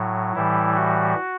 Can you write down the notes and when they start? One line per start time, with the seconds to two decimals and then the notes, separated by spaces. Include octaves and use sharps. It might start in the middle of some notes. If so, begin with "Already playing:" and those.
Already playing: A2 F#3
0.35 A2 E3 G3 E4
0.76 F#4